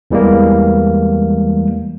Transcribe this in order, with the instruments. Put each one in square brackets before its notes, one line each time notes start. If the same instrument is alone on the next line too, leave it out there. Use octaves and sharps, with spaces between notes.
[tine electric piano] E2 E3 G3 G#3 A#3